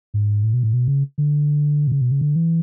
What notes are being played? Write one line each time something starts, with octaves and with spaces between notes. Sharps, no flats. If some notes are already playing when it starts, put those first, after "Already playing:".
G#2
A2
B2
A2
B2
C#3
D3
B2
C#3
B2
C#3
D3
E3